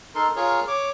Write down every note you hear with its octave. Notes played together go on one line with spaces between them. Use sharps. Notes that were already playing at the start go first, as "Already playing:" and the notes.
D#4 A4 A#4 C6
F4 G#4 A#4 C#5
C#5 D6